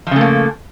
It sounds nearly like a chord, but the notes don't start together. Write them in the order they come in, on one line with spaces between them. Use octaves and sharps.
F3 C#3 A3 A#3